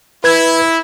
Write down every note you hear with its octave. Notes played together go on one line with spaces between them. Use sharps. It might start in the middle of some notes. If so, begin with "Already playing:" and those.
E4 B4 G#6